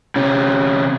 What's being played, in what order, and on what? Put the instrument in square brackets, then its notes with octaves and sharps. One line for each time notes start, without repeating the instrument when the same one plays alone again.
[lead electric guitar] C3 C#4